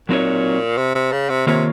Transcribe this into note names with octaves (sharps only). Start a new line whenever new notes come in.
A#2 F#3 C4 D#4 F#4 C#5
C3
C3
C#3
C3
C3 D#3 A#3 F4 A#4 C#5